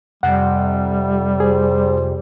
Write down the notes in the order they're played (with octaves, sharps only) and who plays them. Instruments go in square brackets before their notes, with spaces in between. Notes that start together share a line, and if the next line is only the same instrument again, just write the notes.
[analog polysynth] F2 C3 [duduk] G3 [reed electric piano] F#5
[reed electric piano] G#4 [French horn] C5